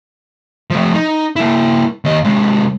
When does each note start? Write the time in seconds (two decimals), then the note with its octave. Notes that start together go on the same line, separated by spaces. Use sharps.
0.70 F3 A3
0.93 D#4
1.36 A#3 E4
2.05 D#2 D#5
2.24 C3 G#3